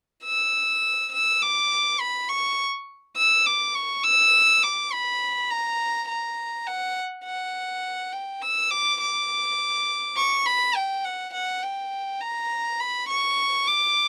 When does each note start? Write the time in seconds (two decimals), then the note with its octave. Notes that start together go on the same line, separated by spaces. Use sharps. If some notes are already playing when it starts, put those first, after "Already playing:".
0.24 E6
1.13 E6
1.41 D6
2.00 B5
2.29 C#6
3.17 E6
3.46 D6
3.74 C#6
4.03 E6
4.62 D6
4.92 B5
5.51 A#5
6.08 A#5
6.67 F#5
7.25 F#5
8.13 G5
8.41 E6
8.71 D6
9.01 D6
10.17 C#6
10.46 B5
10.75 G5
11.04 F#5
11.34 F#5
11.63 G5
12.21 A#5
12.80 B5
13.09 C#6
13.67 D6